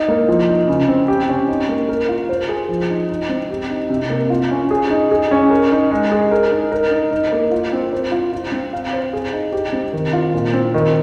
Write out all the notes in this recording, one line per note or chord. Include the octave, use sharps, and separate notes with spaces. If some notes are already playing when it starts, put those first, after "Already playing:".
Already playing: D#4
A#3
F3
D#4
C#3
C4
G4
C#4
D#4
A#3
A#4
F4
C5
G#4
F3
D#4
D#4
C4
G4
D#4
C3
A#3
F4
C#4
G#4
D#4
G#4
C#4
A#4
D#4
G#3
G#4
A#4
D#4
A#4
D#4
D#4
A#3
F4
C4
C5
F4
F4
C4
F5
C5
G#4
D#4
G4
C4
D#3
F4
A#2
C4
D#3